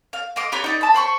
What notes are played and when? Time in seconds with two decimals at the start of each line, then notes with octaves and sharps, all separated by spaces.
0.13 F5
0.36 D#5 F5 C6 D6
0.52 G4 B4 C#5 A#5
0.64 D#4 D5 D#5
0.81 A5 B5
0.94 C5 B5 C#6